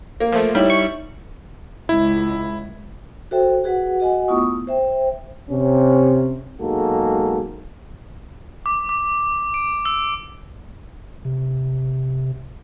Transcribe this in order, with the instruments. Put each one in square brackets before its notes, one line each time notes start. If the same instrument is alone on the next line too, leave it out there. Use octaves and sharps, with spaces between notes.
[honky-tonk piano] A#3
[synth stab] F3 A3
[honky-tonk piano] G3 E4 [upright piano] D#4 C#5
[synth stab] C#6
[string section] C#2 [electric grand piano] E4
[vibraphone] F#4 A4 C5 E5 G5
F#4 G#4 B4 F#5
F#4 D#5 F#5 G#5
A3 B3 E4 F4 C#6 D#6
C5 E5 G5
[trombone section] C3 C#4
B1 G#2 G#3 A#3 F#4 A4
[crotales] D6
D6
D7
E6
[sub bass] C3